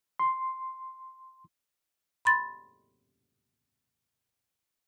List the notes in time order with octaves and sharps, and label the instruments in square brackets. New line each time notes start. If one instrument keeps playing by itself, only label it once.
[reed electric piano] C6
[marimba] B5 C6 A6